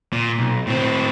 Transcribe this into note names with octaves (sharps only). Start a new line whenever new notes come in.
A#2
B1
A2 C4